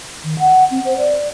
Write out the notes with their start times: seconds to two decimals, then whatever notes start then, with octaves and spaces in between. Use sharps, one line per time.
0.24 D#3
0.39 F#5
0.71 C4
0.85 C5
0.98 D5